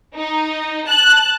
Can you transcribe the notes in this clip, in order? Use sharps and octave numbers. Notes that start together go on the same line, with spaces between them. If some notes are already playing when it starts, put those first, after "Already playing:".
D#4
A5 F#6